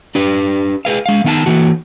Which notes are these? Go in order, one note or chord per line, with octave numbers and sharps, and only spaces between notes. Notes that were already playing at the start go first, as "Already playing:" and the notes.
D4 G4 B4
G#4 B4 F5
G#3 F5
D#3 B3 D#4 F5 A5
E3 A#3 F#4